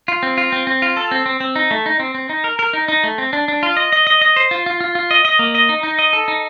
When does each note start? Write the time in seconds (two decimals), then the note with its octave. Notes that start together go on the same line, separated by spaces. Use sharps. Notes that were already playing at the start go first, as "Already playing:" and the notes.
0.08 F4
0.23 C4
0.38 F4
0.52 C4
0.67 C4
0.82 F4
0.97 A4
1.11 C4
1.26 C4
1.40 C4
1.56 D#4
1.71 A3
1.86 D#4
2.00 C4
2.15 C4
2.29 D#4
2.44 A#4
2.59 A#4
2.73 D#4
2.88 D#4
3.04 A3
3.18 C4
3.33 D4
3.48 D4
3.63 F4
3.77 D#5
3.92 D#5
4.07 D#5
4.21 D#5
4.36 C5
4.51 F4
4.66 F4
4.81 F4
4.95 F4
5.11 D#5
5.25 D#5
5.39 A#3
5.55 D#5
5.69 D#4
5.83 D#4
5.99 D#5
6.13 A4
6.28 D#4